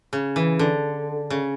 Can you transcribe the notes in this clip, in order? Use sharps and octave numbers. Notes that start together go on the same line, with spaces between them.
C#3
E3
D3
C#3